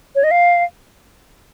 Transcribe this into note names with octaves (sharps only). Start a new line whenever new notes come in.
C#5
D#5
F5